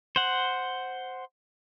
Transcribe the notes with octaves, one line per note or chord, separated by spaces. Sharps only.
C5 F#5